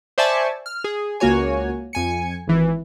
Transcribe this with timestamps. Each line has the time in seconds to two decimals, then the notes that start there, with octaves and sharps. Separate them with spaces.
0.18 C5 D5 E5 G#5 A5 C#6
0.66 F6
0.84 G#4
1.20 C#2 A#3 F#4 C#5 G#5
1.93 F2 G#5 C#7
2.47 G#1 E3